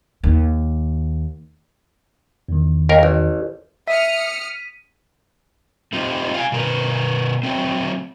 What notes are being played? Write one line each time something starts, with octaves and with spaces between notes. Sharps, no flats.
D#2
E2 D#3
D#2 A#4
A1
E5 D#6 F6 B6 C#7 D#7
A3 C4 D#4 F4 G4
F5 G5 G#5
B2 A#4 B4
F#3 A3 C4